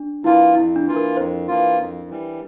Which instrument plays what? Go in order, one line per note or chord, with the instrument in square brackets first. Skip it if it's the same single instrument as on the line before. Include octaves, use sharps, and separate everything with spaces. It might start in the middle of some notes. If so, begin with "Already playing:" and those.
Already playing: [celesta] D4
[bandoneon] E3 A#3 F4 [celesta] E4
[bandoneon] F2 [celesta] E4
[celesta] D4
[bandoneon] E3 A#3 F4
[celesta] A#4
[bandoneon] F2 [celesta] C5
[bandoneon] E3 A#3 F4
F2
E3 G3